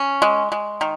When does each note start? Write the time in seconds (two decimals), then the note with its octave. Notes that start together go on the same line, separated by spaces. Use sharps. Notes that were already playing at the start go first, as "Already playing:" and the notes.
Already playing: C#4
0.22 G#3
0.52 G#3
0.81 D#3